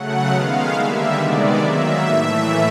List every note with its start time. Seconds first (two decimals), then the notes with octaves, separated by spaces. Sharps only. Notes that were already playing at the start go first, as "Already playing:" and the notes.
Already playing: C#3 F#3 A3 F#5
0.30 D#3 G#3 B3 F5
0.72 D3 G3 A#3 E5
1.15 C3 D#3 G#3 B3 D5
1.58 D#3 F#3 A#3 E5
2.01 A2 E3 A3 E5